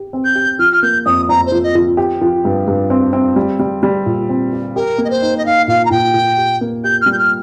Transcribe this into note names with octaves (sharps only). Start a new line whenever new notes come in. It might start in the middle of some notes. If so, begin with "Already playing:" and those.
Already playing: G4
C4
G6
G4
F3 F6
F6
A#3 G6
F2 D#6
F2 A#5
C5
F3
D#5
F3
G4
F3
G2
G2
C4
C4
G3
G3
G3
A#2
C4
G4
G4 A#4
A#3
D#5
C5
D#4
D#5
D#4 F5
A#2 F5
A#5
A#2 G5
A#2
G4
A#3
G4 G6
G3 F6
G6
F6